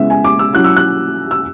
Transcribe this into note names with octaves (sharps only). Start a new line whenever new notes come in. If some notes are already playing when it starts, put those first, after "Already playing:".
Already playing: C#3 G#3 B3 E4 E5
G#5
D6
E6
F#3 C#4 E4 F#6
E6
F#6
E6